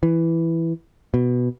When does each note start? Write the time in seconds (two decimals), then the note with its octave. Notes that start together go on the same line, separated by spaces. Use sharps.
0.03 E3
1.14 B2